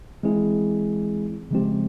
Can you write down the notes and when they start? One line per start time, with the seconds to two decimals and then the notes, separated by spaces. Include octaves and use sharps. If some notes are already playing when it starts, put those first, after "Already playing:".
0.23 E3 G#3 C4 E4 G#4
1.51 C#3 F3 G#3 C4 G4